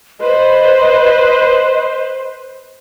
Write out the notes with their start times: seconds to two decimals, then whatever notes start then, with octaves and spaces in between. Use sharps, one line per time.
0.20 B4 C5 D#5